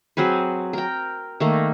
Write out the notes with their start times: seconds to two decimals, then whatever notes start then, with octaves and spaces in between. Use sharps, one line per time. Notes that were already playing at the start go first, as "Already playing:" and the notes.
0.17 F#3 C4 G#4 B4
0.73 A#4 G5
1.40 D#3 A3 A#3